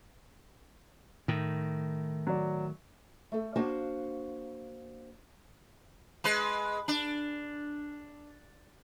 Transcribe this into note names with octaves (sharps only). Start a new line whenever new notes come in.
A2 D#3
F#3 D5
A3 A4
A#3 D4 F#4 C5 F5 F#5
G#3 B4
D4